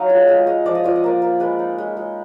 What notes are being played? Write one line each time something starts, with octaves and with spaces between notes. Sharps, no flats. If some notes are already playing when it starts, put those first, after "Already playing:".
Already playing: F#3 D#4 D#5 F5
F4
G#3 F5
G#3 D#5
F3 D5
D#5
F4 D5
D#5
A#3 D5
A#3
G#3 B4
D#4
G#3
G#3